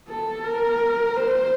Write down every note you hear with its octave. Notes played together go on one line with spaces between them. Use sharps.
A4
A#4
C5